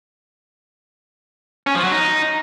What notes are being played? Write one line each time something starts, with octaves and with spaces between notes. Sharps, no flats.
C#4
F3
F#3
D#4